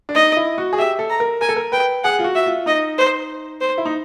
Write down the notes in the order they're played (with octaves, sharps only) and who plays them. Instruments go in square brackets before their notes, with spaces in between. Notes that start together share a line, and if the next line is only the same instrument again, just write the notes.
[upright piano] D4
[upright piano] D#4 [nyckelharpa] D#5
[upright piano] E4
F#4
G#4
[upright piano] G4 [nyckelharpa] E5
[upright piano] A4
[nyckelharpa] A#5
[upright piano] A#4
[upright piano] A#4 [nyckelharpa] G#5
[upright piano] A4
A#4
[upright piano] B4 [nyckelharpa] G5
[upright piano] G#4 [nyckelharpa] F#5
[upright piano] F4
F#4
[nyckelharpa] E5
[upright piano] F4
[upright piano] D#4 [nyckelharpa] D#5
[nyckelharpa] C5
C5
[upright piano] E4
D#4